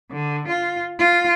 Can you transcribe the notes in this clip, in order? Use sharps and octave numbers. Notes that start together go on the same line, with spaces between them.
D3
F4
F4